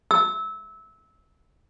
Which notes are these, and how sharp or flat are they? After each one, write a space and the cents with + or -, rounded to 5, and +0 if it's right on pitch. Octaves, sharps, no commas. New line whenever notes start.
E6 -20